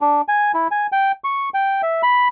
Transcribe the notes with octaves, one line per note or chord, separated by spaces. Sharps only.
D4
G#5
E4
G#5
G5
C#6
G5
E5
B5